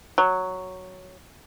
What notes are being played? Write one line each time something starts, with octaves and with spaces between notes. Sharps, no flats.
F#3